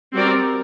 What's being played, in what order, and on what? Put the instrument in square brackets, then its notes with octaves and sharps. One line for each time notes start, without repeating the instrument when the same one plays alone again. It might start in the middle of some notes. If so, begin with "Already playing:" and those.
[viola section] G3 C4 F#4 A#4 D5